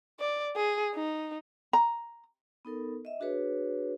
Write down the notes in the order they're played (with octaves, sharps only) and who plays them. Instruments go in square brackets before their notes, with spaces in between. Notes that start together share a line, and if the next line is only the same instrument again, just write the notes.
[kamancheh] D5
G#4
D#4
[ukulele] A#5
[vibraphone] B3 D#4 A4 A#4
D#5 E5
D4 F#4 G#4 B4 C#5